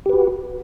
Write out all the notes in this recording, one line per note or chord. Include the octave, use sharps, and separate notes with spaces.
F#4 G4 B4